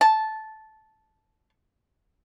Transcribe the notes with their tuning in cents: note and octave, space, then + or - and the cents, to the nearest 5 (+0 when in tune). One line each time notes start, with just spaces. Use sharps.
A5 -10